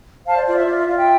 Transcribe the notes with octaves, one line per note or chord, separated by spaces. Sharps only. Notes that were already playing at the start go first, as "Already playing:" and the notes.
C5 F5 A5
D5
F4 D5
E5
F4 D5
E5
F4 D5 F5
E5 G5